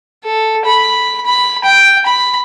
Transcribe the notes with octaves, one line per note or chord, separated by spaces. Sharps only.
A4
B5
B5
G5
B5